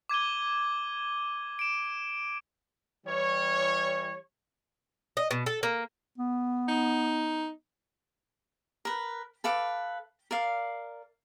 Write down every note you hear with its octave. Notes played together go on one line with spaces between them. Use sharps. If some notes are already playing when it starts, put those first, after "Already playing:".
D6 G#6 D#7 G7
D7 E7
E3 G3 C#5
D#5
B2
A4
A#3
B3
D#4
A#4 B4
A4 B4 F5 D6
A#4 D5 F5